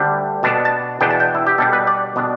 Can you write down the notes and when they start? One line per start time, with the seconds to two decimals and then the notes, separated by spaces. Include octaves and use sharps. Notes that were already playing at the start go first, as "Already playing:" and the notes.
Already playing: D2 D3 G3 D4
0.43 B2 B3 D4 A5
0.65 A5
1.01 E2 B2 B3 D4 G5
1.11 A5
1.20 G5
1.35 E4
1.47 G4
1.58 B2 G3 D4 A4
1.73 B4
1.87 D5
2.16 B2 B3 D4